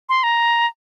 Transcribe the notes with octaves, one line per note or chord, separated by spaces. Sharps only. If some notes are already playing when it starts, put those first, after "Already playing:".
C6
A#5